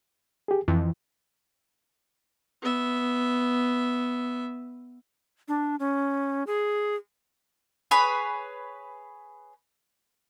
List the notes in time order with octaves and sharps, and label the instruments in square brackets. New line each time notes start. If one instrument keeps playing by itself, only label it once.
[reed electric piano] G4 G#4
[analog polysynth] F2 [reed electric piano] E3
[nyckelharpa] B3 E5
[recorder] D4
C#4
G#4
[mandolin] G#4 B4 C#5 B5